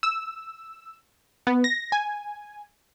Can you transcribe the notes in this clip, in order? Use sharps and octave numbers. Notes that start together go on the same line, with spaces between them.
E6
B3
A#6
G#5